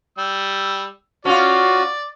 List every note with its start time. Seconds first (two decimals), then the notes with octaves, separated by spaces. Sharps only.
0.18 G3 E6
1.25 C#4 F4 F#4 D5